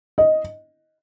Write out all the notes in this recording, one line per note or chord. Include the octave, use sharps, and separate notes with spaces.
D#5